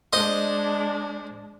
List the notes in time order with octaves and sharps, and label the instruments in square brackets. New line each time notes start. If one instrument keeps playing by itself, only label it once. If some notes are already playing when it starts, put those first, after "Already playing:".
[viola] G#3 D4 [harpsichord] C5 D#5 C6